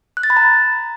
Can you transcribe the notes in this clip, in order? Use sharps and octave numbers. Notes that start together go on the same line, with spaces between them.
F#6
A6
B5
A#5